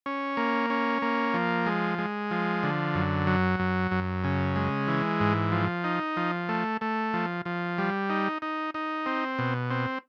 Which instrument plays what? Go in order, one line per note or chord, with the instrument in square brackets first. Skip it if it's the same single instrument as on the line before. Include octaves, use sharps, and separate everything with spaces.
[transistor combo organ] C#4
A#3
C#4
A#3
F3
G#3
G#3
F3
D3
F#2
F#3
F#2
F#2
C#3
G#3
E3
G#2
F3
D#4
F3
A3
A3
F3
F3
G3
D#4
D#4
D#4
C4
B2
C4